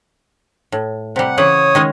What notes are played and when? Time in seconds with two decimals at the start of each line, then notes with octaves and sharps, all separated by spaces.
0.72 A2
1.16 C3 G3 F#5
1.38 C#3 E3 C#5 F#5 D#6
1.75 D#3 G#3 C#4